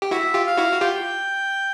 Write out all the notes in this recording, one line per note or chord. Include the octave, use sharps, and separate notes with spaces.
G4
E4 F#4 E5
F4 G4
F5
E4 F#4
F#4
F4 G4 G5